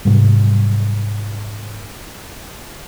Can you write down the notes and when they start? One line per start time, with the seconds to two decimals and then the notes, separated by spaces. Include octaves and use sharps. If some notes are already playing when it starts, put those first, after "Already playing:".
0.05 G#2 C3 F#3 G3